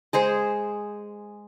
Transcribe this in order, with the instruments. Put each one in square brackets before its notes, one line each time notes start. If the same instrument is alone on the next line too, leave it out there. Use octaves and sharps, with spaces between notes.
[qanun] G#3 G#4 C5